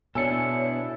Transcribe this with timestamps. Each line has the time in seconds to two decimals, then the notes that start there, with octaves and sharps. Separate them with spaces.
0.15 B2 D4 E4 A4 C#5 G#5 E6 C#7